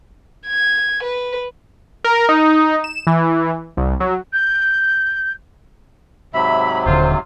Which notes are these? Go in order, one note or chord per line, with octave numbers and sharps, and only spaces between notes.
G#6
B4
A#4
D#4
E7
E3
C2
F#3
G6
G#2 C3 F#3 E5 B5
D#1 D3 F4 C5